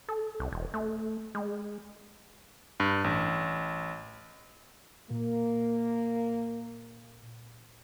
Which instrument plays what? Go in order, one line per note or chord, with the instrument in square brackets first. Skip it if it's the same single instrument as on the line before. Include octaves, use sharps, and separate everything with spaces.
[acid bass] A4
C2
E1
A3
G#3
[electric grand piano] G2
A1
[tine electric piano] A#2 [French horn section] A#3